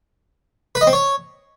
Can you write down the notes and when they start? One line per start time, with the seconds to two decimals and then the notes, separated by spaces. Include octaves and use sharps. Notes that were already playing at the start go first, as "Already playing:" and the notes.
0.75 B4
0.81 D#5
0.87 C4
0.93 C#5